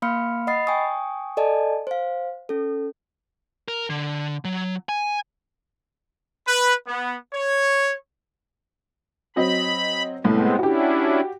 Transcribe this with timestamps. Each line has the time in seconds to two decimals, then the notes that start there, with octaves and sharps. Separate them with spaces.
0.02 A#3 F5 B5 C6 F6 C#7
0.47 D#5 F#5 B5 D#6 A6 C7
0.67 G5 G#5 C#6 D#6
1.37 A4 D5 D#5 G#5 A5
1.87 C5 F5
2.49 C#4 A4
3.68 A#4
3.90 D3
4.45 F#3
4.89 G#5
6.46 B4
6.85 B3
7.32 C#5
9.36 F#3 C4 D#5 B5
10.24 C2 A2 G#3 B3 C4
10.59 C#4 D4 E4 F#4 G4